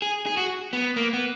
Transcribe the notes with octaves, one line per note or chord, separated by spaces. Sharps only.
G#4
G#4
F#4
B3
A#3
B3